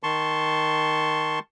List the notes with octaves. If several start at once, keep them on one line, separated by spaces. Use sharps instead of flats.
D#3 A5 C6 C#6